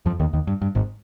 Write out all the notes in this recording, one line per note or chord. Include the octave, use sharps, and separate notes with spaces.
F2 F3
D#2 D#3
D#2 D#3
G2
G2
G#1 G#2